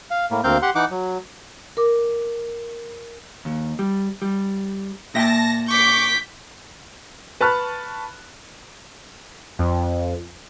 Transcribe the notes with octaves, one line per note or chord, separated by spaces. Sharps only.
F5
A2 A#3
D2 A#3 C4 F5 G6
G4 F#5 C6
E3 D#4 F#5 D6
F#3
A#4 D6
D#2
G3
G3
A#2 E5 G5 A5 A#6
C#6 D6 G6 B6
B4 A5 B5 C#6 F6 F#6
F2